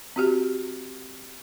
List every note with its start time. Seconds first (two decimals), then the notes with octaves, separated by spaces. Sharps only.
0.16 C4 F#4 G4